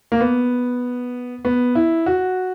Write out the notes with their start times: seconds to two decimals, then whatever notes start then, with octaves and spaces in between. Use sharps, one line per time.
0.12 A#3
0.21 B3
1.45 B3
1.75 E4
2.06 F#4